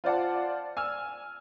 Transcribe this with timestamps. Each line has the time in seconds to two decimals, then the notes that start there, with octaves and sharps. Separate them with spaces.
0.04 F4 C5 D5 F#5 A5
0.77 G#5 E6 F6